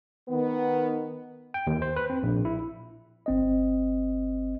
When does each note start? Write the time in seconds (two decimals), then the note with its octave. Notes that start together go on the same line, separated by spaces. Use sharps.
0.29 D#3 B3
1.54 G5
1.67 D#2
1.82 C5
1.96 B4
2.10 C4
2.23 A#1
2.45 E4
3.26 G1 C4 D#5